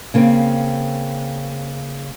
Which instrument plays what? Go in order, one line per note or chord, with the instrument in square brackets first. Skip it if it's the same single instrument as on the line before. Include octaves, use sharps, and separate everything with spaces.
[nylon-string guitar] C#3 A#3 C4